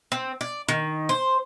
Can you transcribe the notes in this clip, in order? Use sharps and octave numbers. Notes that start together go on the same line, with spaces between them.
C4
D5
D#3
C5